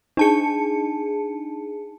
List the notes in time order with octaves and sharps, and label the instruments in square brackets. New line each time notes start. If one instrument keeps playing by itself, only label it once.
[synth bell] D4 A5 C#7 [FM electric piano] D#4 G#4